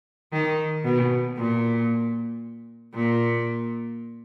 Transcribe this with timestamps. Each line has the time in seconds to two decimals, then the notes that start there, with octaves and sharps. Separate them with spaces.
0.32 D#3
0.84 B2
1.37 A#2
2.94 A#2